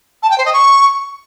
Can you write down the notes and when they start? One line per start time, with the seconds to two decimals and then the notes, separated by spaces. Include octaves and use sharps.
0.22 A5
0.30 G5
0.38 C5
0.46 D#5
0.53 C#6